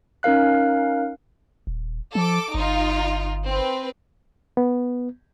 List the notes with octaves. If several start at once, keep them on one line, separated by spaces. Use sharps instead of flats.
C#4 D#4 A#4 F5 F#6
D#1
F3 A4 D6
G1 D#4 F4
C4 B4
B3